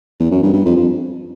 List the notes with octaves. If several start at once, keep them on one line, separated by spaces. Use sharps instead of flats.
E2
F#2
G2
G2
F2
F2